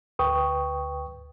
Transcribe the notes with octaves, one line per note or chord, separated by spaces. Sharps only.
D2 B4 G5 C#6 D#6